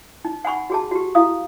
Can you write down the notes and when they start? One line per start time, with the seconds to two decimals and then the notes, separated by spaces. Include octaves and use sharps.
0.25 D#4
0.45 F#5 G#5 B5 C#6
0.70 F#4 G#4 A5
0.91 F#4 G4
1.15 E4 F5 D#6